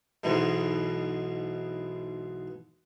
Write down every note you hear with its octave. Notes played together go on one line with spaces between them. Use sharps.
B1 G#2 B2 E3 G#3